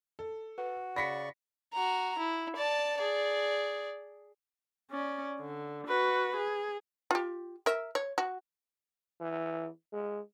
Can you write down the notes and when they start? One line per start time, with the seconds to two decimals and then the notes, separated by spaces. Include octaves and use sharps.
0.19 A4
0.58 F#4 B4
0.96 C#3 D5 B5 C#6 A#6 B6 C#7
1.73 F#4 A#5
2.19 E4
2.56 D5 A5
2.98 G#4 D5
4.91 C#4 D5
5.40 D3
5.87 F#4 B4
6.36 G#4
7.11 F4 G4
7.66 A#4 E5
7.95 C#5
8.18 F#4
9.21 E3
9.93 G#3